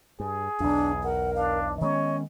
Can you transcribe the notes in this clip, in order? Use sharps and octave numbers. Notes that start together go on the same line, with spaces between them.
G2 G#4
B1 E2 D4
A#4 F#5
D4 F5
D#3 G#3 B3 C#4 C#5 D#5